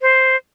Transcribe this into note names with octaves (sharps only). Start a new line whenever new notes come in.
C5